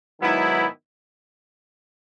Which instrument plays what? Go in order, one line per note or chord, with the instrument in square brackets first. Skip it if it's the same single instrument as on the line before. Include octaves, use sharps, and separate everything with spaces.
[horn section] G#2 D#3 F#3 B3 E4